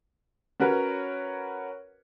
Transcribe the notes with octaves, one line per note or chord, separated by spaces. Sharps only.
C#4 F#4 A#4 B4 C#5